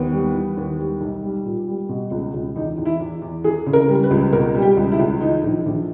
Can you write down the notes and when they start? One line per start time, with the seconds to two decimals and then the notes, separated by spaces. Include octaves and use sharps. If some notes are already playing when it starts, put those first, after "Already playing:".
Already playing: D#2 B3
0.12 G3
0.34 E3
0.57 D#2
0.79 G3
1.01 B1
1.23 G3
1.45 A#2
1.68 G3
1.89 B2
2.11 C#2
2.34 C#2
2.56 E2 D#4
2.78 E2
2.85 E4
3.00 E2
3.22 E2
3.44 E3 G#4
3.66 C#3
3.73 A#4
3.88 G3
4.04 B4
4.11 C#2
4.33 B2 A#4
4.55 G3
4.62 G4
4.77 C#2
4.92 E4
4.99 C#2
5.21 E3 D#4
5.43 A#1
5.66 A#1